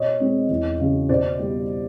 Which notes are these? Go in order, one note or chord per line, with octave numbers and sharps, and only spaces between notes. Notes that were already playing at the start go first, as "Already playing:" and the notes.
Already playing: B2 C#5 D#5
G#3 C4 D#4
E2
C#3 F#3
B2 C5 D5
G3 B3